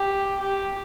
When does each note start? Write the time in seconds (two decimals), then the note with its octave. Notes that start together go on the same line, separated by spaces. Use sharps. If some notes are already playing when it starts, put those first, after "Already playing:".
Already playing: G4
0.40 G4